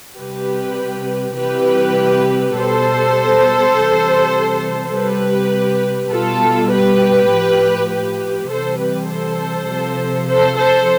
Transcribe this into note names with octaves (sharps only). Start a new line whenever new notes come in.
C3 G3 G4 B4
C3 E3 G3 G4 B4
B2 G3 A4 C5
C3 E3 G3
C3 G3 G4 B4
B2 G3 F4 A4
G4 B4
A2 F3
G4 B4
C3 E3 G3 A4 C5
G4 B4
A4 C5
C3 F3
A4 C5
A4 C5